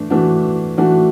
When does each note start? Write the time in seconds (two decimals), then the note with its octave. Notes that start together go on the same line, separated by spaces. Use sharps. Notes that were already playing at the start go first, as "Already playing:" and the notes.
Already playing: E3 A3 D4
0.10 E3 A3 D4 F#4
0.77 E3 A3 D4 F#4